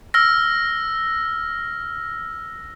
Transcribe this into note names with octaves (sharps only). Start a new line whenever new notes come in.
E6 F6 A#6